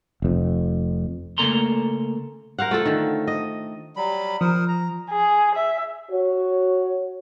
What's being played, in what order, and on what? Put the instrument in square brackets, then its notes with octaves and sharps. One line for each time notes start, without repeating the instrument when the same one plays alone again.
[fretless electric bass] F1 F2
[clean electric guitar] C#3 A3 A#3 A4 A#5 C6
[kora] A#4 C5 F5 F#5
A3 F4 A4
D3 D#3
D#5
[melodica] F#3 G3 B5
[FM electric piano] F3 [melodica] A#4 C5 D#6
[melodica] A#5
[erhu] G#4
E5
[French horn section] F#4 C#5